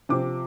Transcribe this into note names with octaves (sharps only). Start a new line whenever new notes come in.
C3 F3 C4 D6